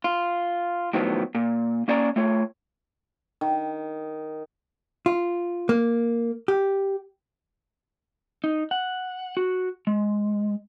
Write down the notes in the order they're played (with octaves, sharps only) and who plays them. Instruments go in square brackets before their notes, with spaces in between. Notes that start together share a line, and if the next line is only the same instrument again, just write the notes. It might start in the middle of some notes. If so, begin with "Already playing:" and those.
[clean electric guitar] F4
A2 D#3 F3 F#3 B3
A#2
A#3 C#4 D5 G#5 A#5
A3 F4 C#5
[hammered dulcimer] D#3
[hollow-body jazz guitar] F4
A#3
G4
[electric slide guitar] D#4
F#5
F#4
G#3